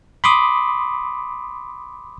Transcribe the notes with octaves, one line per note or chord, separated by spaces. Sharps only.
B5 C6 D6 D#6